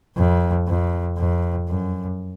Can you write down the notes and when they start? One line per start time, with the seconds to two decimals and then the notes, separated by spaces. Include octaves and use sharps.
0.17 F2
0.68 F2
1.18 F2
1.69 F#2